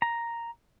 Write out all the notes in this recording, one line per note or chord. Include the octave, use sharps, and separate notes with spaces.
A#5